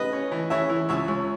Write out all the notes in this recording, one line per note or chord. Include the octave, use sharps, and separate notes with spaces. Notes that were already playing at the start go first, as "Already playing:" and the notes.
Already playing: B4 D#5
C#4
E3
E3 C#5 E5
E3
C#2 C#5 E5
C#2